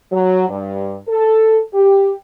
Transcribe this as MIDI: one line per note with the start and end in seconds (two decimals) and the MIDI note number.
0.11 0.44 54
0.49 0.95 43
1.08 1.59 69
1.73 2.12 67